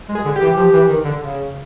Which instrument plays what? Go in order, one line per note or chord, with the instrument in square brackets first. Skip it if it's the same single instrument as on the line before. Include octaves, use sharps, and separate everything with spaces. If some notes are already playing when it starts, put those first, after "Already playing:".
[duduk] G#3
[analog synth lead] G#4
[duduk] D3
[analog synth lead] G4
[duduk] E3
F3
E3
D#3
D3
C#3